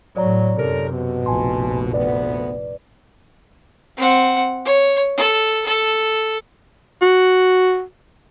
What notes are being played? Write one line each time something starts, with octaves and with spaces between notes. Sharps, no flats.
A2 F#3 C#5 D5 A#5
F#2 C3 D#3 A4 A#4
B2
F1 A#1 G#5 A5 C6
D2 B3 B4 D5
C4 F#5
C#5
A4
A4
F#4